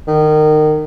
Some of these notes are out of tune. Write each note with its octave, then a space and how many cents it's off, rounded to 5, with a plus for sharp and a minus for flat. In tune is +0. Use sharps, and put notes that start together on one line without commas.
D#3 -25